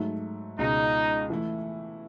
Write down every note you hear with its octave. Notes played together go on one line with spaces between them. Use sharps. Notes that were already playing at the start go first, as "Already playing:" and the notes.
Already playing: G#2 F#3 A3
C#2 B2 G#3 D#4
E3 A3 E4